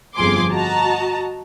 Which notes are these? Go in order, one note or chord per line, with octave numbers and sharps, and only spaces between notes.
G1 F2 F4 G#4 C6 D6
F#4 D#5 A5 A#5